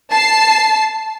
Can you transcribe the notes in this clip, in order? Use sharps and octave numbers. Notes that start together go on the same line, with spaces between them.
A5 C7